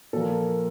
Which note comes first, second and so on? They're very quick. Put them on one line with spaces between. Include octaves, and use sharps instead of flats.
A#2 A4 F3 A#4